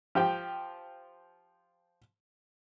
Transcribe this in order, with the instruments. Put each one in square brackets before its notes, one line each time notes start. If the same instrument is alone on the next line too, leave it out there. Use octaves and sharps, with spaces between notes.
[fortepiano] F3 G4 G5